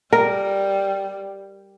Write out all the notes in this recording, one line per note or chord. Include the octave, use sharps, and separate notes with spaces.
G3 A#4